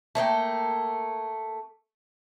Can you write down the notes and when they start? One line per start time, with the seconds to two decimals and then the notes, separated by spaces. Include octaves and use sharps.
0.15 A3 A#3 D5 G5